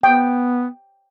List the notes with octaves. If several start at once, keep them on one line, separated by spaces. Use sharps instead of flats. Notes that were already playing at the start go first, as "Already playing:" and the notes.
B3 G5